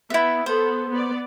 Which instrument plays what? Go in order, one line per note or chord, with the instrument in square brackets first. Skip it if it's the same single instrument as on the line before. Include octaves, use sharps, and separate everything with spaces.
[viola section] B3 [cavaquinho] E4 E5
[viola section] B3 A4 [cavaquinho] C5
[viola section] B3 D5